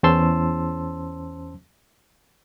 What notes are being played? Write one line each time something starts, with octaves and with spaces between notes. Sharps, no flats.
E2 C#4 C5 A5 C6 E6